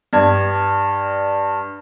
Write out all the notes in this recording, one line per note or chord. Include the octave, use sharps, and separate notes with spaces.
G2 D4 G#6